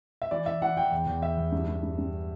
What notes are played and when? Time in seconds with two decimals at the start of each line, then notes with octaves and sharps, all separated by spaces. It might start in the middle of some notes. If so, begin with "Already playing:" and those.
0.22 E5
0.31 E3 D5
0.46 E3 E5
0.62 E3 F#5
0.77 E3 G5
0.92 E2
1.07 E2
1.22 E2 E5
1.37 E2
1.52 G2
1.68 G2
1.83 G2
1.98 G2